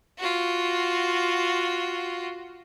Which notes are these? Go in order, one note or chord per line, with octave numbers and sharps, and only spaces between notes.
F4 F#4